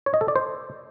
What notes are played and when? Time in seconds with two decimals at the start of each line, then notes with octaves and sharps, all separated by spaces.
0.06 C#5
0.14 D#5
0.21 A4
0.28 D5
0.36 C5